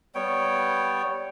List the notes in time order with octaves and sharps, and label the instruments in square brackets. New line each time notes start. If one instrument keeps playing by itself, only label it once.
[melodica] G3 B3 C#5 G5